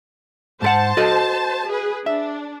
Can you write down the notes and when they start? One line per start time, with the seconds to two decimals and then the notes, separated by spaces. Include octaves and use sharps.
0.62 G#2 A4 C5 F#5 A5
0.97 F#4 A4 D#5
1.68 G#4 B4
2.06 D4 E5